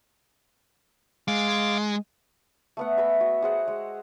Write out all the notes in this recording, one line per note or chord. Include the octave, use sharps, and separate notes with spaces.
G#3 F5 D6 A6
A3 B3 F#5
B4 D#5 E5 B5
F#4
G#4 C5 F#5
G#3